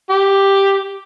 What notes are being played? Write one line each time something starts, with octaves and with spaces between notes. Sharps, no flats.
G4